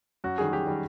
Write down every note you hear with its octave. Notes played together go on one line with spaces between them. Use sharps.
F#2 F#4
D#3 G3 G#4
F#2 G4
D#3 G3